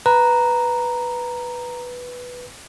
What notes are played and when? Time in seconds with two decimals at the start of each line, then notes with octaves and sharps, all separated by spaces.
0.06 B4 A#5